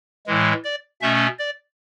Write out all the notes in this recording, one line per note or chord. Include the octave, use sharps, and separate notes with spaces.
A2 E3 G#3
D5
B2 A3 C#4 E5
D5